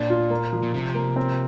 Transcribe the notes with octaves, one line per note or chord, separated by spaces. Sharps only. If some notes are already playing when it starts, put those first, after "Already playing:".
Already playing: A#2 D4
F4
A#3
F3
A#2
C3 F3
A#3
C4